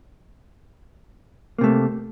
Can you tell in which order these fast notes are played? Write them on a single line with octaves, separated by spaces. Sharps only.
A#3 C3 A3